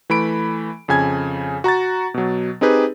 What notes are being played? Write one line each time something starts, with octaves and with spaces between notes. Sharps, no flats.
E3 A3 B5 D7
F2 C#3 G#5 G#6
F#4 A#5 C#6 A6
B2 F#3
C4 D#4 G4 G#4 B4